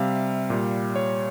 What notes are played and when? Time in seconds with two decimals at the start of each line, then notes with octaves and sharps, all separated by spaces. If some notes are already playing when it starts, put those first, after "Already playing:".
Already playing: C3 G3 E5 F5
0.50 A#2 G3
0.96 C#5